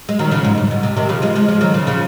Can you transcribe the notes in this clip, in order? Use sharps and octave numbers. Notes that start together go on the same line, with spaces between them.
G#3
D#3 F#3
C#3 F3
G#2
F#2
G#2
C3
C3 D#3
C#3 F3
F3 G#3
F3 G#3
F3 G#3
D#3 F#3
C#3 F3
C#3 F3